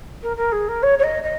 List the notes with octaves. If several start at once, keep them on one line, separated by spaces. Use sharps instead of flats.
A#4
A#4
G#4
A#4
C#5
C#5
D#5
D#5